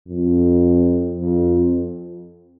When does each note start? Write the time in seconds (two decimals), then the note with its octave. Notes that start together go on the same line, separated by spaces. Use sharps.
0.08 F2
1.14 F2